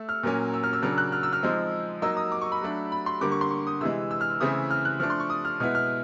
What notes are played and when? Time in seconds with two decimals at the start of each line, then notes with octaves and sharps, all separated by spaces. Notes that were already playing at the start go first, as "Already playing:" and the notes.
Already playing: A3 E6
0.09 F6
0.23 A#2 F#3 A#3 C#4
0.54 E6
0.64 F6
0.73 E6
0.82 C#3 F#3 A#3 D4 F6
0.98 F#6
1.12 F6
1.23 E6
1.33 F6
1.43 F3 G#3 C4 D#4
2.02 F#3 A#3 D#4 E6
2.17 D#6
2.32 D6
2.41 C#6
2.52 B5
2.61 F#3 A3 D4
2.92 B5
3.06 C6
3.21 D3 G3 A#3 D6
3.32 C#6
3.41 C6
3.51 C#6
3.67 D#6
3.81 C3 E3 G#3 E6
4.11 E6
4.21 F6
4.40 C#3 E3 A3 C4 E4 D#6
4.71 F6
4.85 F#6
5.00 F3 A3 D4 F6
5.10 C6
5.20 C#6
5.30 D#6
5.45 F6
5.60 B2 G#3 B3 E4 F6
5.75 F6